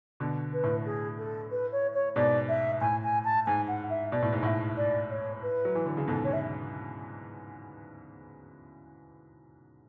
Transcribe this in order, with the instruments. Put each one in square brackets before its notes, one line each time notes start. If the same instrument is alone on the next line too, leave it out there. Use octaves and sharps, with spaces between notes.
[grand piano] B2 D3
[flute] B4
[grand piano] A2
[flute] G#4
A4
B4
C#5
C#5
[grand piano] G#2 B2 [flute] D5
[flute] E5
[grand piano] A2 [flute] G#5
[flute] G#5
A5
[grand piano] G#2 [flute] G#5
[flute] F#5
E5
[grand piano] B2 [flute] D5
[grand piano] A2
G#2
[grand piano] A2 [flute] F#5
[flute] E5
D5
C#5
B4
[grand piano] F#3
E3
D3
C#3
[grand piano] G#2 B2 [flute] A4
[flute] C#5
E5